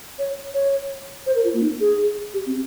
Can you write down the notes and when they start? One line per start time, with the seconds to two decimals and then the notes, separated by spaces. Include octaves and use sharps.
0.19 C#5
0.54 C#5
1.26 C5
1.35 A#4
1.44 F4
1.54 A#3
1.62 D#4
1.80 G#4
2.34 G4
2.46 C4